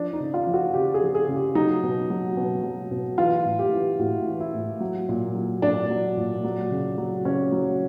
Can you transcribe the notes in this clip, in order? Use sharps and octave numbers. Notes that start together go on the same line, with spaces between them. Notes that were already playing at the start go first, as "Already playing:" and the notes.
Already playing: F3 D4
D#4
C#3
F4
F3
F#4
C#3 G4
G#4
F3
G#4
C#3
G4
F#3 D#4
B2
F#3
B2
F#3
B2
E3 F4
A2
G4
E3
A2 F#4
E3
E4
A2
F#3
A#2
F#3
A#2 D4
F#3
A#2
F#3
C#3
F#3
C#3 C#4
F#3